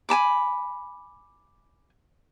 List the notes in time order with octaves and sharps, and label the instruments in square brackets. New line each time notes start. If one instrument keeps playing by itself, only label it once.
[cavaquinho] G#5 A5 B5 D6